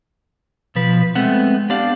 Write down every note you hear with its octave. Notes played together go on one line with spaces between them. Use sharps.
B2 F3 B4
G#3 A3 B3 C4 F#5
B3 D4 G4 D5 F5